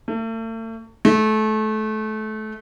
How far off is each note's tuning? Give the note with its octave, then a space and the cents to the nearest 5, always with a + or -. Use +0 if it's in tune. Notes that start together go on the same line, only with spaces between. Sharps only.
A3 +40
A3 -25